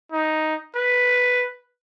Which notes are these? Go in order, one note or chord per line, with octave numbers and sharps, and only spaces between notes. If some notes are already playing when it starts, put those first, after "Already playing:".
D#4
B4